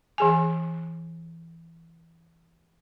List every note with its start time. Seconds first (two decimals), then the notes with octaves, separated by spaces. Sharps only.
0.18 E3 G#4 G#5